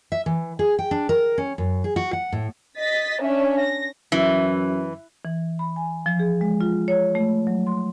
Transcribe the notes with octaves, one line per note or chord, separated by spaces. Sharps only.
E5
E3
G#4
G5
D4
A#4
C#4
F#2
G#4
F#4
F#5
A2
D#5 A6 B6
C#4 D4 E5
A#6
F#2 E3
E3
B5
G#5
F3
G#4
G#3
F4
C#5
A3
F#3
C6